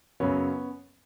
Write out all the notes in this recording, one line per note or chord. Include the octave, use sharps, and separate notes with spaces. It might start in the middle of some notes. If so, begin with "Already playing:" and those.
F#2 C#3 F#3 B3 C#4